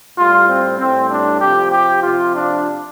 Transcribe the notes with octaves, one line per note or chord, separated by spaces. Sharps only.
A2 G3 F4
C4
A2 G3 C4
D4
C3 F3 G4
G4
C3 F3 F4
D4